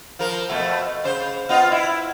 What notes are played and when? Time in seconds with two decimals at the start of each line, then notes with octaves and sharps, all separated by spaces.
0.19 F3 A#4
0.49 F2 B2 A3
1.04 C#3 C5
1.49 B3 F4 D#5
1.72 E4